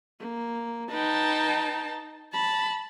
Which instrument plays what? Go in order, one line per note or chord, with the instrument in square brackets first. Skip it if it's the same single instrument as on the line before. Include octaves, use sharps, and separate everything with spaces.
[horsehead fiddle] A#3
[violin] D#4 A5 [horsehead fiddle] B4 G5
[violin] A5 [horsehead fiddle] B5